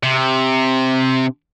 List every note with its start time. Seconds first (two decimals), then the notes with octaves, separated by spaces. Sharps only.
0.03 C3